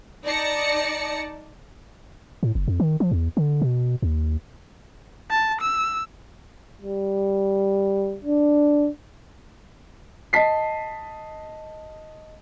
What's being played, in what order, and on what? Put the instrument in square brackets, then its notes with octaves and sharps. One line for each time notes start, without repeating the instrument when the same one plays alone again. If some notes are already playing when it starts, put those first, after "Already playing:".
[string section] D#4 D5 A5 A#6 C#7
[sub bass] A2
F#1
F2
D#3
F3
E2
D3
B2
D#2
[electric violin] A5
E6
[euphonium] G3
D4
[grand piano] D#5 A5 B6 C7